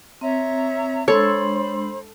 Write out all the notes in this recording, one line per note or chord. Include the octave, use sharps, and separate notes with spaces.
C4 C#5 E5 A#5
G#3 D4 A4 C5 C#5 B5 C6